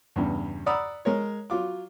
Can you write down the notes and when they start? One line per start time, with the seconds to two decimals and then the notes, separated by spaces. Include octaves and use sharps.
0.16 E2 G2 C#3
0.66 D5 F#5 A#5 B5 D#6 E6
1.05 G#3 A#4 C#5
1.50 F#3 F4 D6